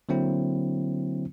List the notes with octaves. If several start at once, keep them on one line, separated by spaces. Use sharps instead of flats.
D3 F#3 A#3 C4 E4